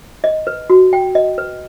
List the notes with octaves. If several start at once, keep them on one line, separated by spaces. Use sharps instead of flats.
D#5
B4
F#4
G5
D#5
B4